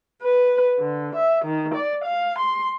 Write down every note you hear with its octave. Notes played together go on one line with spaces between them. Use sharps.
B4
D3
E5
D#3
D5
F5
C6